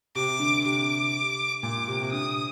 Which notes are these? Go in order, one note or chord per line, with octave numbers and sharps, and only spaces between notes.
C3 D6
D3
C3 D6
A#2 D6
C3
C3
D3 D#6